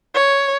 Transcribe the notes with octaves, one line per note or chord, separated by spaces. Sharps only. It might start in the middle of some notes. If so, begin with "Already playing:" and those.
C#5